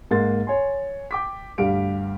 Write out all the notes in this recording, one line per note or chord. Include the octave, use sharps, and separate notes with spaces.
G#2 A#3 C6 A6
C#5 G#5 C6
G5 D6 B6
D2 G2 G4 F5 D7